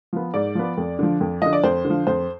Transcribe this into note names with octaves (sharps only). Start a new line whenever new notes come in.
F3 B3
G#2 D5
F3 B3
F2
D3 F3
F2
D3 F3 D#5
D5
F2 C5
D3
F3
F2 C5